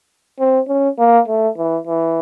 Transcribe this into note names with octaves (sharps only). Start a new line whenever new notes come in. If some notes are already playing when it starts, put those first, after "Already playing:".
C4
C#4
A#3
A3
E3
E3